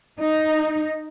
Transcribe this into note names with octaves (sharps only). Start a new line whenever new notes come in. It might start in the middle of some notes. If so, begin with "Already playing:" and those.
D#4